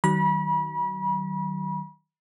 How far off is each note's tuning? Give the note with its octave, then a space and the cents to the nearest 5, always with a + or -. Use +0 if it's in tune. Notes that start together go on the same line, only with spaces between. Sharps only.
D#3 +0 F#3 +35 B5 -35